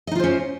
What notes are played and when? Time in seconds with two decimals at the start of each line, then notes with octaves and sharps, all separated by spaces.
0.07 D#5
0.11 D#4
0.15 F4
0.20 C5
0.24 C#4